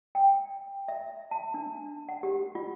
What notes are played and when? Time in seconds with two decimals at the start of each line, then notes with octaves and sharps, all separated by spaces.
0.15 G5
0.88 E5
1.31 A5
1.54 D4
2.09 F#5
2.23 G4
2.55 F4